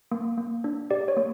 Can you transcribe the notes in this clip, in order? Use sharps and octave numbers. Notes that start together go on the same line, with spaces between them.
A#3
A#3
D4
G4 D5
C#5
A#3